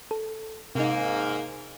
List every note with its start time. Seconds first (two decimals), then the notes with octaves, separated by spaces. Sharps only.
0.11 A4
0.75 G#2 C3 A#3 D#4